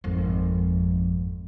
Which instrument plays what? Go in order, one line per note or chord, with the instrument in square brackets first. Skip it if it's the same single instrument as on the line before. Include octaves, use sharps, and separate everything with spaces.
[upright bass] G#1 F2